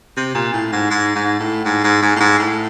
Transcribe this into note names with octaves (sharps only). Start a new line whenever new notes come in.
C3
A#2
A2
G#2
G#2
G#2
A2
G#2
G#2
G#2
A2
G#2
A2